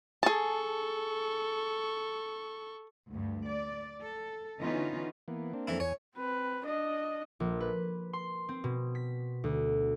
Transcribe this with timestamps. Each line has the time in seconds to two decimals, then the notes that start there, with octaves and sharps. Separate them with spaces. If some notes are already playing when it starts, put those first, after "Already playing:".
0.23 G#4 A4 A5 C#6
3.11 D2 G2
3.48 D5
4.02 A4
4.59 D3 E3 B3 C#4 D#4 F4
5.28 E3 A#3 B3
5.53 A#3 C4 D4
5.68 F2 E3 E4
5.80 E2 C#5 G#5
6.16 C4 B4
6.65 D4 D#5
7.40 A#1
7.60 B4
8.13 C6
8.49 C4
8.64 B2
8.95 B6
9.44 D2